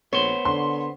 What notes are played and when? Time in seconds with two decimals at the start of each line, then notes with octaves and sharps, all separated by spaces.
0.13 A#1 B3 C5 C#5
0.45 D3 C6